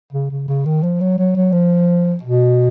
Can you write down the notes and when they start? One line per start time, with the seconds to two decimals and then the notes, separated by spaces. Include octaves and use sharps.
0.13 C#3
0.31 C#3
0.48 C#3
0.65 D#3
0.83 F3
1.01 F#3
1.18 F#3
1.36 F#3
1.52 F3
2.23 B2